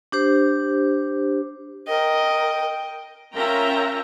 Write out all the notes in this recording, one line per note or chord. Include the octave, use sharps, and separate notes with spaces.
D4 G4 C5
A#4 D#5 G5
C#4 F4 A#4 E5 G5 A#5